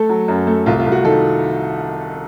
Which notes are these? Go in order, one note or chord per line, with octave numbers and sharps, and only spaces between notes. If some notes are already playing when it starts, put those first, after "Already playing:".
Already playing: A3 A4
F#3
F#2
A3
C2 F4
F4
C2
F#4
D#3 A4